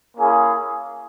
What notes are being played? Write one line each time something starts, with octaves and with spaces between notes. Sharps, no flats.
A#3 C#4 E4 G#4